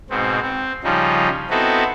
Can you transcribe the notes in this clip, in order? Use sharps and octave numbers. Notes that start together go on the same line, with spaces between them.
G#2 B2 C4
C4
C#3 F3 G3 D#4
B3 C4 D#4 E4 F#4 A4